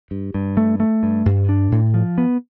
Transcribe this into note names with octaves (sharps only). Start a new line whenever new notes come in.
G2
G2
A3
A3
G2
G2
D4
A2
F3
B3